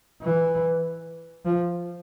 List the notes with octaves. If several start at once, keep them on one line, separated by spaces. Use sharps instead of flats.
E3
F3